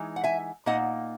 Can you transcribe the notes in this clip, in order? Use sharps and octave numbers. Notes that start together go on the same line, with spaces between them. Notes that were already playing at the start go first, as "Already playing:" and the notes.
Already playing: E3 G#3 D#4
F#5
E5 G#5
A#2 A#3 D#4 D#5 F#5